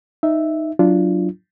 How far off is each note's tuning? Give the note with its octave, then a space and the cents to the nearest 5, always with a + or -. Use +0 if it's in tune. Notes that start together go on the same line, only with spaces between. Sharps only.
D#4 +0 E5 +0
F#3 +0 D4 +0 F4 -25